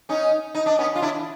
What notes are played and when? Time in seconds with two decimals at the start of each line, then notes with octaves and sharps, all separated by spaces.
0.09 C#4 D#4
0.55 D#4
0.66 D4
0.78 B3 C#4
0.95 F4
1.02 D4 E4